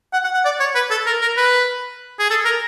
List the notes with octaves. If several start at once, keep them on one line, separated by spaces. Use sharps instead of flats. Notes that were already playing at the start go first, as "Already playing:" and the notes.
F#5
F#5
F#5
D5
C#5
B4
A4
A#4
A#4
B4
G#4
A4
A#4